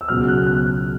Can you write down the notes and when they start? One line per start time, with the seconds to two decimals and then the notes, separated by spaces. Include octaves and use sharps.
0.01 E6
0.08 C#2 B2 F#3 F6
0.28 F#6
0.38 F6
0.47 F#6
0.66 F#6